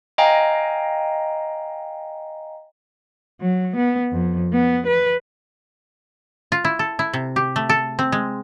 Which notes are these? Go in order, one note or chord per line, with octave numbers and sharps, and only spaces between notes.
D#5 F5 G5 G#5 A#5
F#3
B3
F2
B3
B4
F4
E4
A4
E4
C3
G4
A3
A4
C4
G#3